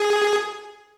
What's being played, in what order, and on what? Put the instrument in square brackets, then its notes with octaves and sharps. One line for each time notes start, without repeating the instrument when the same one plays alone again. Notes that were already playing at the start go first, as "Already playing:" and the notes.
Already playing: [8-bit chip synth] G#4